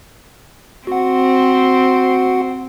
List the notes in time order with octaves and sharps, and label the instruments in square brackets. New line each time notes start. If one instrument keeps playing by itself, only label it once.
[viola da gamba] C4 [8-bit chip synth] F#4 F#5